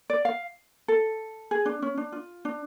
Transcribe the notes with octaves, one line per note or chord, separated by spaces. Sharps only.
D5
F5
A4
G#4
D4
C#4
D4
F4
D4